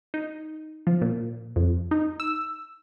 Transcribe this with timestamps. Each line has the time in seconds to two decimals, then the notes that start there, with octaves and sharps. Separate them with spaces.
0.14 D#4
0.87 F3
1.01 A#2
1.56 F2
1.91 D#4
2.20 E6